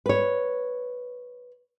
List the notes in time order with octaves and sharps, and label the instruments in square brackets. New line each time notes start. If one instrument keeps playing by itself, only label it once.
[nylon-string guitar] B4 C#5